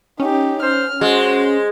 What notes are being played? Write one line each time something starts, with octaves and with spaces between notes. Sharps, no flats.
C#4 D#4 G4
C5 F6
G#3 F#4 C5